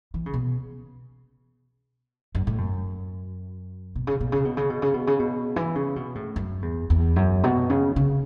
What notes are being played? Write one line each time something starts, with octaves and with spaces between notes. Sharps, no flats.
E3
C#3
B2
F#2
A2
F#2
B2
C#3
B2
C#3
B2
C#3
B2
C#3
B2
C#3
B2
E3
C#3
B2
A2
F#2
E2
E2
F#2
B2
C#3
C#3